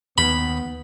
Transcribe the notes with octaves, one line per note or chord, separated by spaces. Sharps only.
D#2 B3 B5